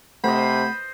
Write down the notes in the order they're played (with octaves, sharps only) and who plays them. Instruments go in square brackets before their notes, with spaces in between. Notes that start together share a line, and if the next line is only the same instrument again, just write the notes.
[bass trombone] C3 [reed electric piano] A3 F#5 [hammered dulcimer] C5 D#5 [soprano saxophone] B5